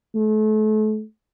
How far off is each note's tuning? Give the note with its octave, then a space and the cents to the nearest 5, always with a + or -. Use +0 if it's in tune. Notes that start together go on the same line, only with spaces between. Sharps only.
A3 -35